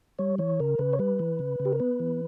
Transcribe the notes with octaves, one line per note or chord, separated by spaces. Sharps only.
G3 C#5
E3 C#5
C#3 A#4
C#3 B4
C#5
G3 B4
E3
C#3
C#3
G4
A#4
B3 B4
E3